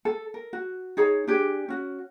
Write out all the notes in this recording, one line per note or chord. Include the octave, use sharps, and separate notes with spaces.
A4
A#4
F#4
D#4 G#4 C#5 A#5
D4 G4 G#4
C#4 F#4